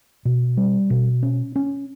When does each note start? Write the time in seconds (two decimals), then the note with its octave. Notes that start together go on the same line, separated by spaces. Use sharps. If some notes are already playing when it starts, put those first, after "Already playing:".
0.25 B2
0.57 G3
0.90 B2
1.23 C#4
1.56 C#4